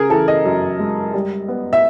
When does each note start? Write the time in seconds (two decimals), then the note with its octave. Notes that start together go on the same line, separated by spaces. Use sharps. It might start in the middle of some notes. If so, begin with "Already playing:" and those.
Already playing: C#3 G#4 A#4
0.10 E3 A4
0.28 D#5
0.45 F#2
0.80 G#3
1.14 G3
1.48 B3
1.73 E5